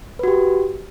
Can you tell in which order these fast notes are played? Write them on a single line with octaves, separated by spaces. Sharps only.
B4 F#4 G4